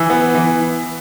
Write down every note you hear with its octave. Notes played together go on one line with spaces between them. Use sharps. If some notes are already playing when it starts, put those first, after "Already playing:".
Already playing: E3 E6
B3
E3